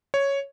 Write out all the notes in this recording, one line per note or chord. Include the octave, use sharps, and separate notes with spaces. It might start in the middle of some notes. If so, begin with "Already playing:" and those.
C#5